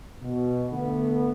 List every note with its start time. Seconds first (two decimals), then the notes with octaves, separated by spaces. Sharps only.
0.22 B2
0.70 D3 A3 B3